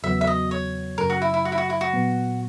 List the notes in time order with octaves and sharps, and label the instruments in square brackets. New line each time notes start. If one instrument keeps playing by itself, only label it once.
[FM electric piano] E2 C#3 F#3 B3 F#4 [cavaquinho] E5
[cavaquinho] E5
D#5
C#5
[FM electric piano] F#2 C#3 F#3 [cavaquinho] A#4
[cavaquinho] F#4
E4
E4
F#4
E4
F#4
E4
F#4
[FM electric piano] A#2 F#3 B3